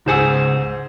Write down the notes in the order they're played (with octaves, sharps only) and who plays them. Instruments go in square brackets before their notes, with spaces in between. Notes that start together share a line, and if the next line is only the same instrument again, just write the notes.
[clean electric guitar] C#2 C5 F#5 [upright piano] G#2 G#4 E6